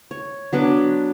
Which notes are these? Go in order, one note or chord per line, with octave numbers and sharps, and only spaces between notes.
C#5
F#3 B3 D4 D6